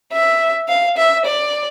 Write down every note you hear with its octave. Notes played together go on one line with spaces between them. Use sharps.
E5
F5
E5
D5